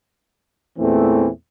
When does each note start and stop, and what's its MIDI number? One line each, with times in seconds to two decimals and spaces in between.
0.79 1.28 40
0.79 1.28 46
0.79 1.28 52
0.79 1.28 57
0.79 1.28 60